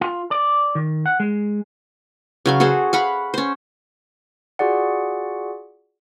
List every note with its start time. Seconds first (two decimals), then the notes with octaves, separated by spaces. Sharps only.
0.01 F4
0.31 D5
0.75 D#3
1.06 F#5
1.20 G#3
2.46 C#3 F#3 F5
2.60 F#4 G#4 A4 C5
2.93 F5 F#5 B5 C#6
3.34 C#4 C5
4.59 F4 F#4 G#4 D5 F#5